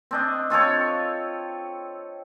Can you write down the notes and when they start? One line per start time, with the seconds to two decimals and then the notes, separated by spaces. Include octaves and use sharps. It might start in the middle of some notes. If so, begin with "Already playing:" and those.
0.11 C4 D4 D#5
0.50 C4 F4 A4 C#5